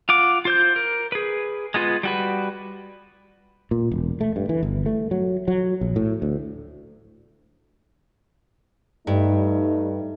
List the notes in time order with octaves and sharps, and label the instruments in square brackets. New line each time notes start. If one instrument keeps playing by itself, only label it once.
[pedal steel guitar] F4 F#5 D6
F4 C5 G6
A#4
G#4 B4
G#3 B3 F4 B4
G3 F#4 B4
[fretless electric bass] A#2
E1
A3
G2
E3
G1
A3
F#3
F#3
A#1
A2
D2
[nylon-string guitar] G2 [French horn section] G3 A3 D#4